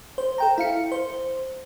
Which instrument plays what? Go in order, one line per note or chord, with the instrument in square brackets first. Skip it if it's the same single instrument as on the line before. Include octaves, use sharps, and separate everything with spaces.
[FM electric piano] C5
A4 G5 A#5
E4 F5 C#7
C5